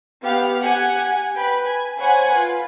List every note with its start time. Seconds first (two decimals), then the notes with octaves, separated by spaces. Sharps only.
0.23 B3 G4 F5 F#5 F6
0.60 G4 F#5 G#5
1.35 B4 G5 B5
1.65 G#5
1.98 C5 C#5 F#5 G#5 B5
2.34 F4 B4